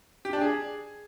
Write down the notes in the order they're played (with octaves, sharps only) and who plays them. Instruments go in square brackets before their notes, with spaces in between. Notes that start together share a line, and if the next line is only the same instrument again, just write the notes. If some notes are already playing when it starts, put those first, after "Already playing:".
[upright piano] G4
D4
G#4